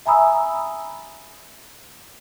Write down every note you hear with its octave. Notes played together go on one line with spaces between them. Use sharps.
E5 G#5 A#5 B5 D#6 E6